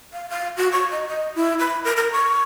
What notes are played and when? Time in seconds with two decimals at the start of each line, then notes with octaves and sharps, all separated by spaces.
0.13 F5
0.30 F5
0.57 F#4
0.72 C#6
0.91 D#5
1.08 D#5
1.35 E4
1.59 B5
1.85 A#4
1.97 A#4
2.12 C#6